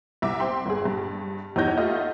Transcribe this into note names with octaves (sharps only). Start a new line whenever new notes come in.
C2 E5 D6
C4 G5 C6
G1 G#4
G2
E2 D#4 G4 C#5 G6 A#6
A3 F4 G4 D#5 E5 F#5